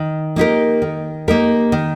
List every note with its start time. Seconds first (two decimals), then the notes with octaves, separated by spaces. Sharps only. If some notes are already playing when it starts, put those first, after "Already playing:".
Already playing: D#3
0.36 A#3 D#4 G4 A#4
0.82 D#3
1.28 A#3 D#4 G4 A#4
1.72 D#3